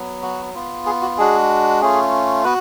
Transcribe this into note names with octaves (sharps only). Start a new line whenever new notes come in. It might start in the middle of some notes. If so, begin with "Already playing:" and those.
Already playing: F#3 B3
F#4
B3 F4
G#4
F#4
G#3 D4 F#4 G#4
A3 C#4 F4 G#4
B3 F#4 B4